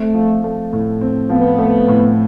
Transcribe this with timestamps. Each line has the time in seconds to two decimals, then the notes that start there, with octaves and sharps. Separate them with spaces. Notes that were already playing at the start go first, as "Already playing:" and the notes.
Already playing: A3 C4
0.14 F3
0.44 A3
0.73 A2
1.01 C4
1.30 F3 B3
1.59 A3
1.88 A2